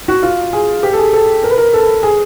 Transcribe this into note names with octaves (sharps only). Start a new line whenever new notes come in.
F#4
F4
G#4
G4
A4
G#4
A4
A#4
B4
A#4
A4
G#4